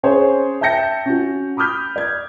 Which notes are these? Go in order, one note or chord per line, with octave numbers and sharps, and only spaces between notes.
C#4 G#4 C5 C#5
E5 G5 A5 G6 A#6 C#7
C#4 F#4
B5 D6 D#6 F6 G6 B6
D5 G#6